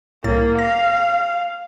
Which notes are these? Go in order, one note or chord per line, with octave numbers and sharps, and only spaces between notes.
C2 A2 A#3 A6
F5 A#6